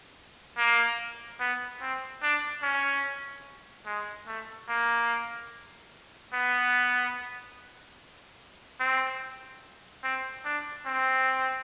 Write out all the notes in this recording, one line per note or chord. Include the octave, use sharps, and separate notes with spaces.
A#3
B3
C4
D4
C#4
G#3
A3
A#3
B3
C4
C4
D4
C4